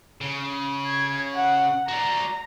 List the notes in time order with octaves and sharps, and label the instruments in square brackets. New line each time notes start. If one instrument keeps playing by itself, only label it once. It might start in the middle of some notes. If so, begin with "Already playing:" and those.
[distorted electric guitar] C#3
[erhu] G#6
F#5
[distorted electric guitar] F#4 D5 [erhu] A#5